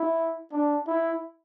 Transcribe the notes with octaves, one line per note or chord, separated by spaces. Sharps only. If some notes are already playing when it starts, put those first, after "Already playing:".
Already playing: E4
D4
E4